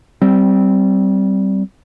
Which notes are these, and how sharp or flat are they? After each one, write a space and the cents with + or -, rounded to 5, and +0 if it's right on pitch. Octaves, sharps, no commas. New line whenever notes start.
G3 -20 C4 +0